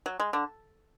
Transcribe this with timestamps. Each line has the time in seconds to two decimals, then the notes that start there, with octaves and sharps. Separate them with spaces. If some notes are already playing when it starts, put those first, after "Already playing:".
0.06 F#3
0.20 G#3
0.33 D3